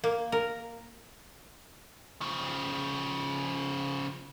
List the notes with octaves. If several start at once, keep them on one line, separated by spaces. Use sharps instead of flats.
A#3
A#4
C#3 F3